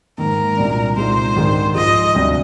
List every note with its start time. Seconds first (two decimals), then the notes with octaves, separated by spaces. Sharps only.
0.18 G#2 D#3 A#3 A#4
0.57 C2 A#2 G3 D4
0.96 C2 A#2 G#3 D#4 C5
1.36 G#2 D#3 G#3 D4
1.75 G#2 F3 G#3 D#5
2.14 D2 C3 G3 D4